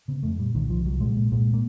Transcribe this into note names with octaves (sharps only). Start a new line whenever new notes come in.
C#3 B3
F2 A3
A#2 G3
C2 D#3
C2 F3
C2 F#3
A#2 G#3
A#2
A#2 G#3
A#3